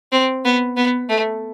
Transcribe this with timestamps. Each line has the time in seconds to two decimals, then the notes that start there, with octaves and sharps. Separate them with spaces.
0.12 C4
0.45 B3
0.77 B3
1.09 A3